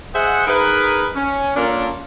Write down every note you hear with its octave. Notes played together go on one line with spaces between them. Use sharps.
G#4 C5 D#5 E5 F#5
D#4 G#4 A#4 B4
C#4
A#3 C#4 D4 F4 A4 A#4